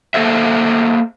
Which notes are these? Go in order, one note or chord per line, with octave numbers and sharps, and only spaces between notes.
A#3 A4 C5 E5